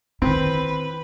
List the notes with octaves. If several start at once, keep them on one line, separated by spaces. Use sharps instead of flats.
D#3 C4 E4 B4